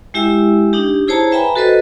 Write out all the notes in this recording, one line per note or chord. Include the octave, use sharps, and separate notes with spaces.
G#3 E4 G4 E5 G5 E6
D4 D#4 G4
E4 G#4 C5 C#5 A5 A#5
B4 E5 G5 G#5 A#5 B5
F#4 A4 B4 C5 D#5